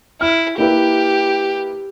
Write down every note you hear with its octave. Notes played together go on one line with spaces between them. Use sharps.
E4 F6
A#3 E4 G4 B4